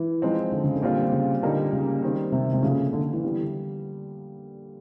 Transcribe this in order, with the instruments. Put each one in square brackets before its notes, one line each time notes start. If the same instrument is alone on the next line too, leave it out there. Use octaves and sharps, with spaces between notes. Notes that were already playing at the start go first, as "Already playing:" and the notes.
Already playing: [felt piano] E3
[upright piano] F3 G#3 C4 D#4
[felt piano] D3
C#3
D3
[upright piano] A#2 G3 C4 F4
[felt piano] C#3
[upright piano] A#2 G3 A#3 D#4 [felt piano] D3
[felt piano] C#3
[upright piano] D#3 G3 C4
[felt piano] C3
C3
[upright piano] A#2 F3 A3 [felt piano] C#3
[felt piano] D3
E3
[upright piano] D3 G3 B3